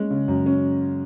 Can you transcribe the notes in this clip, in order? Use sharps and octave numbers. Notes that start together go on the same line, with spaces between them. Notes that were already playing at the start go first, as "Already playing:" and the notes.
Already playing: G#3 C#4
C#3
F#2
C#4